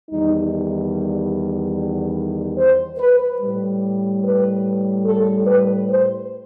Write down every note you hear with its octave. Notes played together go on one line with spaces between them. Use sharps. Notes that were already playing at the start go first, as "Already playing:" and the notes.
E2 D#3 G3 D#4
C5
B4
A2 G3
B4
A4
B4
C5